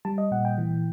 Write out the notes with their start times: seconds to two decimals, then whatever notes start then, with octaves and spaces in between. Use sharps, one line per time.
0.05 G3 A5
0.18 D#5
0.31 A#2 F#5
0.45 G5
0.58 E3